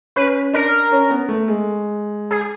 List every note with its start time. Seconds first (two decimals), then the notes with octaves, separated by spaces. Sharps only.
0.16 C#4 B4
0.53 D4 A#4
0.92 C#4
1.10 B3
1.29 A3
1.48 G#3
2.31 G#4